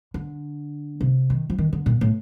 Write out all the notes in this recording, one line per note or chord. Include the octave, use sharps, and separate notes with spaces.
D3
C3
D#3
F3
D#3
D3
A#2
A2